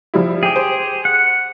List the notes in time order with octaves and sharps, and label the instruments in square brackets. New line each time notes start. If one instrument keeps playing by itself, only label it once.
[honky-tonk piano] F3 G3 E4
[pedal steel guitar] G4 G#4 [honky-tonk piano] G5
[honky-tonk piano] C5
[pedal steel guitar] F#5